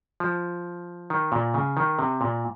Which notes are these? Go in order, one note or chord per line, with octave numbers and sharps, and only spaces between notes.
F3
D#3
A#2
C#3
D#3
C3
A#2